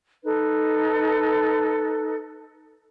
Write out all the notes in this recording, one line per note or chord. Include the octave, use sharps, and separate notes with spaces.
D#4 A4 B4